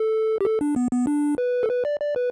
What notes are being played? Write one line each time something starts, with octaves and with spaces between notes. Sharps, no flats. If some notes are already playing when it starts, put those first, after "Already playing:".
Already playing: A4
G4
A4
D4
B3
B3
D4
B4
A4
B4
D5
D5
B4